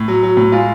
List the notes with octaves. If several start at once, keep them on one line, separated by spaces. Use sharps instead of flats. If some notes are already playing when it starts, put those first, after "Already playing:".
Already playing: A2
F#3
F#3
A2
G#3 F4